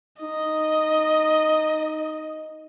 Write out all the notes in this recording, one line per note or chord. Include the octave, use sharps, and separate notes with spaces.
D#4 D#5